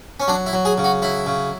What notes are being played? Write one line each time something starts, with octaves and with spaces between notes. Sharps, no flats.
C#4
F#3 D4
E4
F#3
G#4
C#3
F#4
F#3 E4
C#3